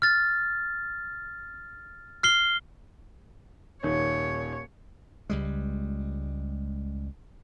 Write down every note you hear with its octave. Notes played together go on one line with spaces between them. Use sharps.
F6 A6
F6 C7 G7
D#1 D#3 C#5
C#2 G3 G#3